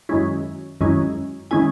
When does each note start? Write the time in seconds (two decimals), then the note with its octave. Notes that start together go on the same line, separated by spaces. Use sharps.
0.09 F#2 D#3 G#3 C#4 E4
0.81 F#2 D#3 G#3 C#4 E4
1.51 D#3 G#3 C#4 E4 G#5